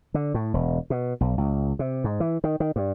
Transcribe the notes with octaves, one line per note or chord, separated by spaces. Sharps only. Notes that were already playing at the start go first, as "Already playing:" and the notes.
D3
A2
E1
B2
B1
C#2
C3
G#2
E3
D#3
D#3
G2